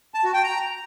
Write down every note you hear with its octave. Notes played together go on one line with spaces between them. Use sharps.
A5
F#4
G5
A#5